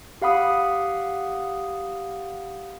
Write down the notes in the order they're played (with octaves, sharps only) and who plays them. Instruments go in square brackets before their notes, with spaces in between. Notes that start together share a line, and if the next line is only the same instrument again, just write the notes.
[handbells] G4 F5 F#5 B5 D#6